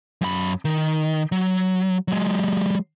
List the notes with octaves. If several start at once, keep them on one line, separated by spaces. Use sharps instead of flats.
F#2 B5
D#3
F#3
F#3 G#3